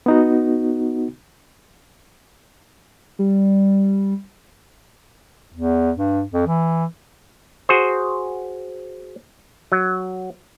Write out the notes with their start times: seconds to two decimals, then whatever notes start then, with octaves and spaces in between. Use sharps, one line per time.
0.06 B3 D#4 F#4
3.19 G3
5.54 E2
5.97 G2
6.33 F2
6.47 E3
7.69 F#4 G#4 C5
9.72 F#3